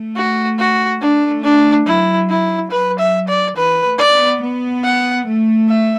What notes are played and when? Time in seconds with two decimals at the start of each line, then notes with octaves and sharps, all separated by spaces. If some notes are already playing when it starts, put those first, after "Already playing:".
Already playing: A3
0.16 F#4
0.58 F#4
1.01 A3 D4
1.43 D4
1.86 F#3 E4
2.29 E4
2.71 F#3 B4
2.99 E5
3.28 D5
3.56 E3 B4
3.85 A3
3.98 D5
4.13 B3
4.42 B3
4.83 F#5
5.26 A3
5.68 E5